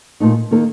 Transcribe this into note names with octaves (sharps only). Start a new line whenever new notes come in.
A#2 A3 D#4
D#3 A#3 D#4 A4